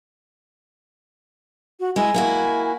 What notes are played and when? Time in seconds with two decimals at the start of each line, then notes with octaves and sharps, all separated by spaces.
1.80 F#4
1.96 G#3 E4 G#5
2.14 A#3 E4 F#4